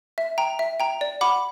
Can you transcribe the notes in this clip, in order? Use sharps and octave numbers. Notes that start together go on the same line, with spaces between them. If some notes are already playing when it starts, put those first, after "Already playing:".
E5
G5 A#5
E5
G5 A#5
D5
F#5 B5 D6